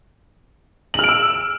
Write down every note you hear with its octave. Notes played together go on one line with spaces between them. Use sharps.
E6 F6 D7 F#7